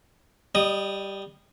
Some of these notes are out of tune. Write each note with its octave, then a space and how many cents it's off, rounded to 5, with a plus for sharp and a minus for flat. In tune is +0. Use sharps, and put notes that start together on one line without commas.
G3 +0 D#5 -25 D#6 +0